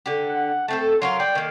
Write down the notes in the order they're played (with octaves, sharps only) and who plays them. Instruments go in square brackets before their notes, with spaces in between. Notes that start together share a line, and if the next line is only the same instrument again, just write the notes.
[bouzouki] D3 G4
[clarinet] F#5
[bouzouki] A3 C4 A4 [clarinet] A5
[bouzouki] F#3 A#4 F5 [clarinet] C6
[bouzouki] D5 [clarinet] G5
[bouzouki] D#3 A#3